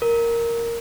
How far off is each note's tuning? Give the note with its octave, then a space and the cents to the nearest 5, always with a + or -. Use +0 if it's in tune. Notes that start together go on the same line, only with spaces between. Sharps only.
A#4 -5